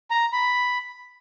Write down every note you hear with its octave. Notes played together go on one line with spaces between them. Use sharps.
A#5
B5